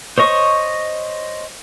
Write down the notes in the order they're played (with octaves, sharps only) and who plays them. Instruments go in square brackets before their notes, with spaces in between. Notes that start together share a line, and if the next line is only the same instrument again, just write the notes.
[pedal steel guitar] C5 C#5 D#5 C#6